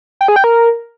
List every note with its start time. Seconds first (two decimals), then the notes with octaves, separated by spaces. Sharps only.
0.21 G5
0.28 G#4
0.36 G5
0.44 A#4